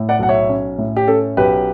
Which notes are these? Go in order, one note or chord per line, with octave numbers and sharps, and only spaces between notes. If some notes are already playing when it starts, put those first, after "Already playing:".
Already playing: A2
D5 F#5
B1 F#5
C#5 E5
C#4
A2
G4
C#4 A4
B1 G4 B4